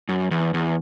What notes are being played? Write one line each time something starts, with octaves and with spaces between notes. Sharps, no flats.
F#2
E2
E2